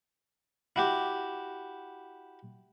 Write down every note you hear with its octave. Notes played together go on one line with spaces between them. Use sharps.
E4 F#4 G4